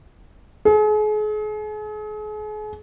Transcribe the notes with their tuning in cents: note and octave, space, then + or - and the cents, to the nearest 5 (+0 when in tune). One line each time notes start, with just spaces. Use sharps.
G#4 +40